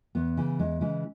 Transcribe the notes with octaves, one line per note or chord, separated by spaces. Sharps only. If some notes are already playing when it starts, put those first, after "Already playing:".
E2 B3
C#3 E3
E2 G#3
C#3 E3 G#3